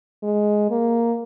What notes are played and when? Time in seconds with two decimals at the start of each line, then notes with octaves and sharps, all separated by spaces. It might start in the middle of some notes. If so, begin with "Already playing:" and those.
0.23 G#3
0.71 A#3